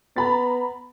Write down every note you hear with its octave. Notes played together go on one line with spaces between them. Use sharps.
B3 A#5 B5 A6